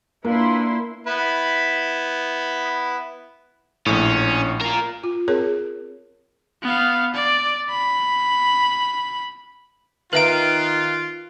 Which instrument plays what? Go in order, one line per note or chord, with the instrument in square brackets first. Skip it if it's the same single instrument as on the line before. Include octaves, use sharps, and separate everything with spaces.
[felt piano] A#3 [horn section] D4 F4 B4 [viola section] E4 C6
[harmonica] B3 E4 B4
[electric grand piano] A#1 A2 [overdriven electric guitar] C#4
[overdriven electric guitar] F4 A#4
[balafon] F4
C4 G#4 A#4 C#5
[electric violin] B3 F5
D5
B5
[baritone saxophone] D#3 [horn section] F4 [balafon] B4 E5 A#5 [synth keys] F#6 D7